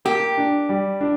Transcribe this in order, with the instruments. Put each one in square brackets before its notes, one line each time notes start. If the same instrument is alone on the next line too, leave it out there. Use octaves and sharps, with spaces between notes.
[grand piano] A#3 [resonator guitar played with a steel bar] G4
[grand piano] D4
G3
D4